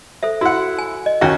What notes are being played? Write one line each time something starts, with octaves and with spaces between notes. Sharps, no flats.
A4 C5 E5
E4 F#4 F#5
G#5
D#5
D#2 C#4 F#4